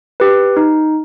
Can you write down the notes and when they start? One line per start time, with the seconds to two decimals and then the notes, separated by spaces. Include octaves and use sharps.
0.20 G4 B4
0.57 D#4